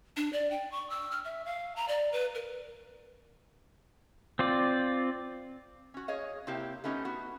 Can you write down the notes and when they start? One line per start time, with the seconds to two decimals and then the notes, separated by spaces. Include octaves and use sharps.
0.17 D4
0.33 D5
0.51 G5
0.72 C#6
0.90 E6
1.11 F6
1.25 E5
1.46 F5
1.76 A#5
1.88 D5
2.13 B4
2.35 A#4
4.39 C4 F4 D5
5.94 C#4 F#4
6.08 G#4 C#5 D#5 F5
6.47 C3 A#3 C4 E4 G4
6.84 A3 B3 C#4 D#4 G4
7.05 B3 F#4